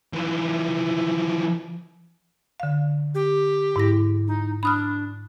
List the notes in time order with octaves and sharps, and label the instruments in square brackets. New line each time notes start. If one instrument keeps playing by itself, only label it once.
[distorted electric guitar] E3 F3
[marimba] D3 F5
[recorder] G4
[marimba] G#2 E4 A#6
[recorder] D#4
[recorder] D4 [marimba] B5 D#6 F6